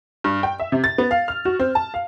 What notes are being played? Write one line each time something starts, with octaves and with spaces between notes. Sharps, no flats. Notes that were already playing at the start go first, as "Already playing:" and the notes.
G2
G5
E5
C3
A6
B3
F5
F6
F#4
C4
A5
F5